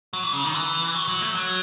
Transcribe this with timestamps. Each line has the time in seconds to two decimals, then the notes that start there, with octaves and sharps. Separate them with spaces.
0.13 F#3
0.23 E3
0.33 C#3
0.44 D#3
0.54 E3
0.95 F#3
1.08 F#3
1.22 A3
1.35 F#3